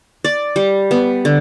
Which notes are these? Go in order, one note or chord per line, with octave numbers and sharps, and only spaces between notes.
D5
G3
B3
D3